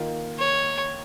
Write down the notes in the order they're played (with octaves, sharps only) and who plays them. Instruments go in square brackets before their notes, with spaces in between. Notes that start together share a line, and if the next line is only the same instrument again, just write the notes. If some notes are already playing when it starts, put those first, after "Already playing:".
Already playing: [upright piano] D#3 A#3 F4 A#4
[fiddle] C#5